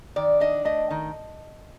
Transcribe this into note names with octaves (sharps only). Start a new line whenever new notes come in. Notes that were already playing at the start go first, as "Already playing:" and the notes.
D#3 D5
D4 D#5
A3 D#5
D#3